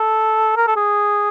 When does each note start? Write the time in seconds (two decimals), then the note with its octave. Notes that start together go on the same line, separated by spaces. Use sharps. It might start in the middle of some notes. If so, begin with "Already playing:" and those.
Already playing: A4
0.56 A#4
0.67 A4
0.76 G#4